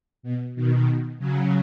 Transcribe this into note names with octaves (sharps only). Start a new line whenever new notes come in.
B2
B2 D#3
C#3 F#3